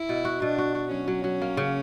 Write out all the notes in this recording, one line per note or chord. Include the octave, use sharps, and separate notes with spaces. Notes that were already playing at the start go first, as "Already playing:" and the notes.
Already playing: E4
B2
F#4
B2 D4
F#4
F#4
F#3 C#4
F#3
F#3
A#3
C#3